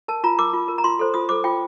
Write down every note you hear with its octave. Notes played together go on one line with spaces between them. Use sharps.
A#4 A5
F4 A#5
A#4 D6
F4
A#4
A#5
F4 C6
A4 C5
F4 D#6
A4 C5 D6
F4 G5